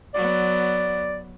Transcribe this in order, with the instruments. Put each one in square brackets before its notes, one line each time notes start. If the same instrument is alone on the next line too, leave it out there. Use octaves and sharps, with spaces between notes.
[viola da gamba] F#3 B3 [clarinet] D5